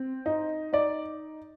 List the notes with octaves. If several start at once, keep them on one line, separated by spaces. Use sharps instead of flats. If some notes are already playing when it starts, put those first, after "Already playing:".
Already playing: C4
D#4
D#4 D5